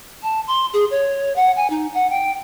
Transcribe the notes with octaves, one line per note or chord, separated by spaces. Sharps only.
A5
C6
G#4
C#5
F#5
G#5
D#4
F#5
G5